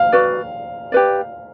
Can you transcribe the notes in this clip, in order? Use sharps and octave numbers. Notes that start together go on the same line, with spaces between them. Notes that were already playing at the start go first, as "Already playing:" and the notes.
Already playing: F5
F#4 B4 D5
G4 B4 D5